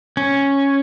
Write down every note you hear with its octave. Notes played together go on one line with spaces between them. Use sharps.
C#4